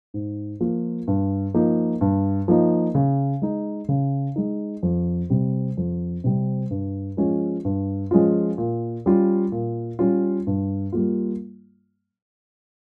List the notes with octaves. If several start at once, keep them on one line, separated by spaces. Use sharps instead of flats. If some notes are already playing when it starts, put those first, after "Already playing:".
G#2
F3 A#3 F4
G2
F3 A#3 D#4
G2
F3 A#3 D#4
C#3
G#3 D#4
C#3
G#3 D#4
F2
C3 G3 C4
F2
C3 G3 C4
G2
F3 G#3 C#4 F4
G2
F3 G#3 C#4 F4
A#2
G3 C#4 F4
A#2
G3 C#4 F4
G2
G3 A#3 F4